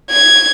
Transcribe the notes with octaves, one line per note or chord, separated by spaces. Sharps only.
G#6